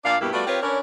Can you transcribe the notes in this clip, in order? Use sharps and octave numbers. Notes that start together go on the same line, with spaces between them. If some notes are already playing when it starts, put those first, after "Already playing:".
A#2 D4 D5 F5
G2 B2 A#3 B3 E4 G4
G3 A3 B3 F4 F#4 D5
C4 F4 G4 A#4 B4 C#5
C#4 D4 A#4 B4 C#5